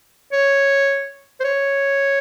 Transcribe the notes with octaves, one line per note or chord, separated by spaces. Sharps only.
C#5
C5
C#5